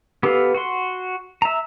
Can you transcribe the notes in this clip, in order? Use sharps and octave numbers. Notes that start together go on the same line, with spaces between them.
B3 G4 A4 B4 F5
F#4 F#5 C6
E5 A#5